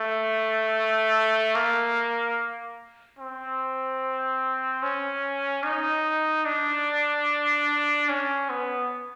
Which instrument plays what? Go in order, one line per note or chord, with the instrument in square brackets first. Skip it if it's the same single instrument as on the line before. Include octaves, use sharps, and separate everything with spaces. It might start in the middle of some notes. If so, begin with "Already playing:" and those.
Already playing: [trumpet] A3
A#3
C4
C#4
D#4
D4
C#4
B3